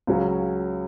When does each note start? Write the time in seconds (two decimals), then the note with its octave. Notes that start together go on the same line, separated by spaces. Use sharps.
0.07 C#2 C#3 F#3 C#4